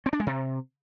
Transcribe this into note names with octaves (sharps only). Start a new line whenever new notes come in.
C4
D4
G#3
C3